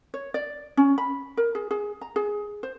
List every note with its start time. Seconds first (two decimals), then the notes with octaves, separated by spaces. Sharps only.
0.14 C#5
0.34 D5
0.77 C#4
0.98 B5
1.37 A#4
1.55 G#4
1.71 G#4
2.01 A#5
2.16 G#4
2.63 C5